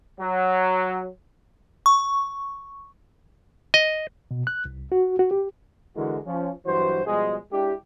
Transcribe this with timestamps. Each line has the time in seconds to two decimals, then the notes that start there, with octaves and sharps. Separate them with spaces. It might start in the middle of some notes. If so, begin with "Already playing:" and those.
0.18 F#3
1.86 C#6
3.74 D#5
4.31 B2
4.47 F#6
4.65 C2
4.92 F#4
5.19 F#4
5.31 G4
5.96 D3 E3 G#3 E4 F#4 A#4
6.25 F3 C#4
6.66 G2 E3 F#3 F#4 C5
7.06 B2 F3 G3 G#3
7.52 G#3 D4 E4 G4